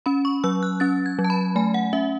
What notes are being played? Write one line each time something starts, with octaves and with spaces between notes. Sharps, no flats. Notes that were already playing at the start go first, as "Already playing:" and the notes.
C#4 B5
C#6
F#3 E6
F#6
C#4 A6
G#6
F#3
A5
B5
A3 G#5
F#5
C#4 E5